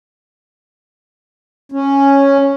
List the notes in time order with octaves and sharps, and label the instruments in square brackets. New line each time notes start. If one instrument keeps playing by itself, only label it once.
[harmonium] C#4